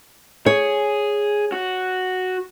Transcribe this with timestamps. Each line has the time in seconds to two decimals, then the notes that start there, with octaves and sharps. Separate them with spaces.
0.46 G#4 C#5
1.52 F#4